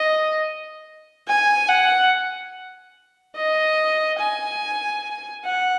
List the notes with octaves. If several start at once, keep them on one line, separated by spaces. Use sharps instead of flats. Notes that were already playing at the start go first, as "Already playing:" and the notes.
Already playing: D#5
G#5
F#5
D#5
G#5
F#5